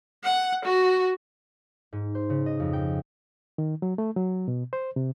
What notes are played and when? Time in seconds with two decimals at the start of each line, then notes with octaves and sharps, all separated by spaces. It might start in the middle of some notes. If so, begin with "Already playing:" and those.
0.24 F#5
0.65 F#4
1.93 G#2
2.15 C5
2.30 C#3
2.46 D#5
2.60 F2
2.73 G5
3.58 D#3
3.82 F#3
3.98 A3
4.16 F#3
4.48 B2
4.73 C5
4.96 C3